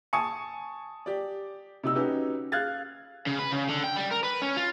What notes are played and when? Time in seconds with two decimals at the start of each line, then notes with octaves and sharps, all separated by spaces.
0.13 G#5 A5 C#6 D#6 C#7
1.06 G4 D5
1.83 C3 D#4 E6
1.95 C#4 D#4 F#4 G4 B4
2.52 F5 F6 F#6 G#6 A6
3.27 C#3
3.39 B4
3.52 C#3
3.69 D3
3.84 G5
3.96 G3
4.11 A#4
4.23 B4
4.42 C#4
4.56 F4